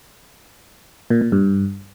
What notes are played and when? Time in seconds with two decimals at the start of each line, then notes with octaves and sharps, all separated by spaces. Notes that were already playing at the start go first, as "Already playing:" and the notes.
1.10 A#2
1.21 A#2
1.32 G2